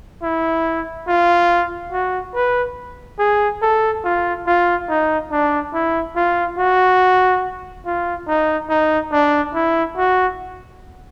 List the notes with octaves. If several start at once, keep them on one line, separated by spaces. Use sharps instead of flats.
E4
F4
F#4
B4
G#4
A4
F4
F4
D#4
D4
E4
F4
F#4
F4
D#4
D#4
D4
E4
F#4